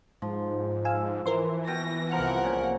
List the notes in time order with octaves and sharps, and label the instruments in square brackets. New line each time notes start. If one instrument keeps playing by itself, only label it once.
[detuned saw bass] G#2 [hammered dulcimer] F3
[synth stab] F5 G#5 E6
[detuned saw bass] E3 [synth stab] A#4 C5 C6
[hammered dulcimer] B2 G5 [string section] A#6
[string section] C2 A#4 F#5 [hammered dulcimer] F3 [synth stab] A#5 F6
[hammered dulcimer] A#2 C#3